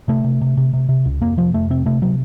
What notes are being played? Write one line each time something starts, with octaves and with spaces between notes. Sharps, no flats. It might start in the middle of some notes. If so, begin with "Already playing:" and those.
C3 A3
C3
C3
C3
C3
C3
C#2
F2 A#3
C3 F3
F2 A3
C3 C4
C3 A3
C3 F#3